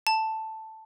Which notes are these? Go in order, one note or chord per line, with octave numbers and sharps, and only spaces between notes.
A5